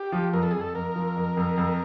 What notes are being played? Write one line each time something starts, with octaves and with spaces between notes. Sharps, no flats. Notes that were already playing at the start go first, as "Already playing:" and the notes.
Already playing: G4
F3
F2 A#4
A4
F2 G#4
A4
F2 A#4
F3
F2
F2
F2